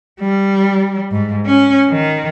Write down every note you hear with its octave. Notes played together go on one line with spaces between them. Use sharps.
G3
G#2
C#4
D#3